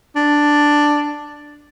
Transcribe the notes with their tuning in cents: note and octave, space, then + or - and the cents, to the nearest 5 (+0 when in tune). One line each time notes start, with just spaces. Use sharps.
D4 +5